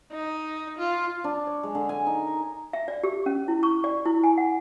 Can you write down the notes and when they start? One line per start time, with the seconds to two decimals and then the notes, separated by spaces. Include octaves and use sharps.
0.12 D#4
0.78 F4
1.24 D4
1.47 C#5
1.63 G#3
1.75 D3
1.89 G#5
2.06 D#4
2.27 A#4
2.73 E5
2.88 D5
3.03 G4
3.26 C#4
3.48 E4
3.63 C#6
3.84 D5
4.05 E4
4.24 G#5
4.38 F#5